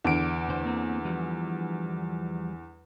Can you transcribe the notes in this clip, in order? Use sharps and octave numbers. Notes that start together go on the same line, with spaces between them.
E2 D3 D7
D2 C5
A#3 C4
E3 F3 G3